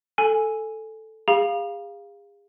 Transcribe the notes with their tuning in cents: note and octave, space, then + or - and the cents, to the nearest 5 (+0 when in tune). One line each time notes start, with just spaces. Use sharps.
A4 +0 G#5 +0
G#4 -40 F5 +0 B5 -45